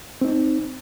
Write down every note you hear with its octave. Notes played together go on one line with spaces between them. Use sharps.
C4 D#4